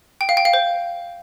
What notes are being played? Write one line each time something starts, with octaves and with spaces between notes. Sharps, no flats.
G5
F5
G5
F5
C5